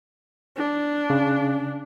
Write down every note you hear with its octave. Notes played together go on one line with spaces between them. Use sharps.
D4
C#3